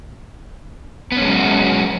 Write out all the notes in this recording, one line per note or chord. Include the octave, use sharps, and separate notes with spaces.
F#3 G#3 B3 C#4 F#4